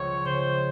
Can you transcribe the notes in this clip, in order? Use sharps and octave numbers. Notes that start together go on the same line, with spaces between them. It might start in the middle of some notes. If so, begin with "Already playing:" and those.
Already playing: C#2 F3 C#5
C#3 C5